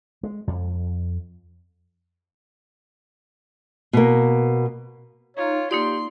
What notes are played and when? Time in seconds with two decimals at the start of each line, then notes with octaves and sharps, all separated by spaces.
0.23 G#3
0.47 F2
3.93 B2 A#3
5.37 D#4 F4 C#5
5.71 A#3 D#4 F4 G4 D5 C6